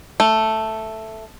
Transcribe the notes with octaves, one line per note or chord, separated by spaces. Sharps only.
A3